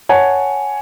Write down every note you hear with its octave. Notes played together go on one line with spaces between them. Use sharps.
C#5 F#5 G#5 A5